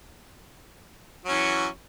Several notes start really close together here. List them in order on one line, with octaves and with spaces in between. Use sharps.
F#3 C#4 E3